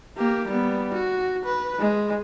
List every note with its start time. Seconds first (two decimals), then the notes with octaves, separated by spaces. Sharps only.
0.17 A#3 G4
0.48 G3 B3
0.94 F#4
1.45 B4
1.79 G#3